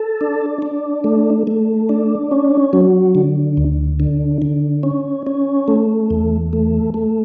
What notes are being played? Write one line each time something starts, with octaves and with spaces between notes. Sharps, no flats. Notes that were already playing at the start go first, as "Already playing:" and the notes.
Already playing: A4
D4
D4
A3
A3
D4
C#4
F#3
D3
D2
D3
D3
C#4
C#4
A3
E2
A3
A3